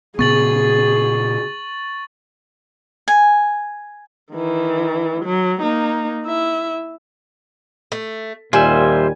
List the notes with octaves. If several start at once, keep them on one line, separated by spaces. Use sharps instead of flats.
A#2 C#3 B3 G#4 C#6 A6 F#7
G#5
D#3 E3
F#3
A#3 D#4
E4 E5
A3
D#2 A#2 G3 F4 C5 E5 G#5